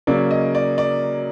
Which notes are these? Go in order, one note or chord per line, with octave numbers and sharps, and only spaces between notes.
C#3 F#3 A#3 D5
D#5
D5
D5